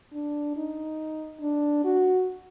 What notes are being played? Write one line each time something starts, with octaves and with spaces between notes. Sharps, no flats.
D4
D#4
D4
F#4